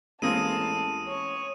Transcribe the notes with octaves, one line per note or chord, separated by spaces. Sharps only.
A1 G#3 A#3 C4 A5 D#6 D#7
C#5